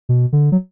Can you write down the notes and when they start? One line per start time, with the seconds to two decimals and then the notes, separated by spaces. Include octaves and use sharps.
0.09 B2
0.32 D3
0.52 F#3